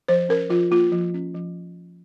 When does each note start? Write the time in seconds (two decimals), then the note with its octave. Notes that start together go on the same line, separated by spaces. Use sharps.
0.08 F3 C5
0.29 C#4 A#4
0.50 F3 F4
0.71 A#3 F4
0.92 F3
1.14 C#4
1.34 F3